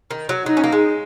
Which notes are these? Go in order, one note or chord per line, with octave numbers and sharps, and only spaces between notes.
D#3
F#3
F#3 D#4
C#4
A#3
G#3